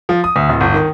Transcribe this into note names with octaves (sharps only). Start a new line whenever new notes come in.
F3
D#6
D2
D1
G1
D#3